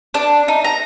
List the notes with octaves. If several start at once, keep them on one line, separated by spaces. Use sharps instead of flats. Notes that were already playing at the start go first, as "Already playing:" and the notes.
D4
D#4
A#5